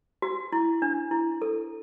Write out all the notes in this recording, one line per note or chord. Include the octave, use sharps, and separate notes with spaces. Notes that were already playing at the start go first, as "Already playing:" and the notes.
F#4
E4
D4
E4
A4